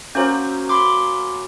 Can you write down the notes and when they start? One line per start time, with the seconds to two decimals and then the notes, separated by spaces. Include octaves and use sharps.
0.15 F#3 A#3 C#4 C5 G#5
0.69 B5 C6 D6